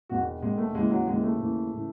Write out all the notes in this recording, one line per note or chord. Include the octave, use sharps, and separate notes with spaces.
E1 E2 D#3 F#4
E1 E2 D#3 G#3
A3
D#2 C#3 E3 G#3
F#3
D#2 C#3 E3 G#3
A3
D#2 C#3 E3
C#3 E3